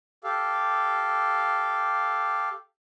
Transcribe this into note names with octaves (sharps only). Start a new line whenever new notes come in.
G4 A4 F5